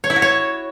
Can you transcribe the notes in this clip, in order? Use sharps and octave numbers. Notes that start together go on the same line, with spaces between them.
C#5
E4
F#4
C#5